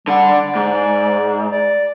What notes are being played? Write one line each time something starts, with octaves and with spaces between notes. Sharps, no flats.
D3 G3 F#5
D5
G#2
D5